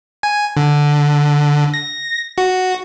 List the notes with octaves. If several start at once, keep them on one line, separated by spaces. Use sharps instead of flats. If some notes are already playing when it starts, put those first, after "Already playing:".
G#5
D3
A#6
F#4